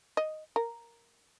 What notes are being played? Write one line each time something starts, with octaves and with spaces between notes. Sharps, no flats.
D#5
A#4